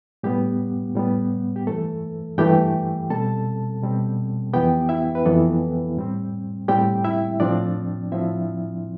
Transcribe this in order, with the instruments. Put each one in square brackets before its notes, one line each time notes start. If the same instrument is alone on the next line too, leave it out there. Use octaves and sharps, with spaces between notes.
[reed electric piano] A2 G3 B3 G4
A2 G3 B3
G4
G2 E3 A3 A4
G2 E3 A3 G4 G5
B2 G3 C4 A4 A5
B2 G3 C4
F2 E3 B3 G4 G5
E4 E5
B4
F2 E3 B3 A4
A2 G3 C4
A2 G3 C4 G4 G5
E4 E5
A2 F3 C4 D4 D5
A2 F3 C4 E4 E5